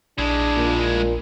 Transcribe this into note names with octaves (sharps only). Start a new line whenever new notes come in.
A#1 G#3 D4 E4
A#2